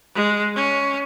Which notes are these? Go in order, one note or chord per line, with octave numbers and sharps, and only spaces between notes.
G#3
C#4